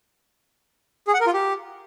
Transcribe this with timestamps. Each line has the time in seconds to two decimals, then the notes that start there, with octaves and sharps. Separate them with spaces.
1.07 G#4
1.14 F#5
1.20 A#4
1.27 F4
1.33 G4